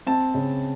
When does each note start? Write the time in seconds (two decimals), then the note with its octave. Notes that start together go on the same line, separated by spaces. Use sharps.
0.07 C4 A5
0.34 C#3